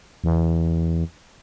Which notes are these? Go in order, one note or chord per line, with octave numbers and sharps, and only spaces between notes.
E2